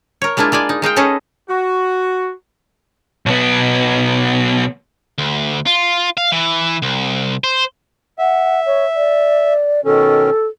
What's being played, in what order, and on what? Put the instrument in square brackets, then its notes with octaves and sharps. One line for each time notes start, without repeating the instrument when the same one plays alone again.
[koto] A#4 C#5
G#3 A#3 D4 E4 F4
G#3 F4 D5 G#5
D#4
G#3 D#4 F5 G5
C#4 G#4 A4 B4 C#5 D#5
[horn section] F#4
[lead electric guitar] B1 B3
[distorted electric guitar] D2
F4
F5
E3
C2
C5
[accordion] E5 [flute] F#5
[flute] C#5
D5
[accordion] B2 D#3 C#4 [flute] A4